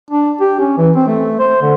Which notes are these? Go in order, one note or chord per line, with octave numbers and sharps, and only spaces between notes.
D4
G4
C#4
E3
C4
A3
C5
D3